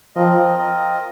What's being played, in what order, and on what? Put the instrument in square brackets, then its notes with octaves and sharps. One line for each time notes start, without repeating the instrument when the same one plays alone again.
[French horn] F3 [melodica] C4 F4 A#4 D#5
[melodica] C4 F4 A#4 D#5